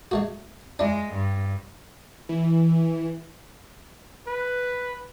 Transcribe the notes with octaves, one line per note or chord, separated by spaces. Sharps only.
G#3 A3 F#4
G#3 D4 E4
G2
E3
B4